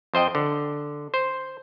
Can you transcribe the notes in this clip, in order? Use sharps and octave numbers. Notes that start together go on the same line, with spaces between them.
F2 C5 D#5 G5
D3
C5